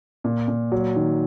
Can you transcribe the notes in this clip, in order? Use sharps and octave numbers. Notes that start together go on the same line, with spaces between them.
A#2
A#2
F#3
D#3